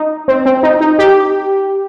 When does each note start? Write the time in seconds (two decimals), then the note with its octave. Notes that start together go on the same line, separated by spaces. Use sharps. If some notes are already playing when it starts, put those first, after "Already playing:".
Already playing: D#4
0.28 C4
0.46 C4
0.63 D#4
0.81 D#4
0.99 G4